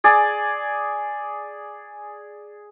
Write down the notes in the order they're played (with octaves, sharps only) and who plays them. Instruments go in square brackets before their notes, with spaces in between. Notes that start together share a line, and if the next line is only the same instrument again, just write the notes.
[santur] G#4 D5 G#5